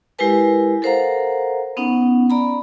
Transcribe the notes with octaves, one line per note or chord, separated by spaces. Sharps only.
G#3 E4 G4 A#4 B4 G#5
A4 A#4 C5 F5 F#5 A#5
B3 C#4 D#4 F#5
D5 A#5 B5